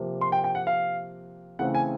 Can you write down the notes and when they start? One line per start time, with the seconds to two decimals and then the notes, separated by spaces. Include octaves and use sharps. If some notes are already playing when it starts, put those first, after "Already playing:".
Already playing: C3 F3 A#3
0.21 C6
0.32 G5
0.44 G5
0.55 F#5
0.67 F5
1.59 C#3 E3 A3 C4 F#5
1.75 G#5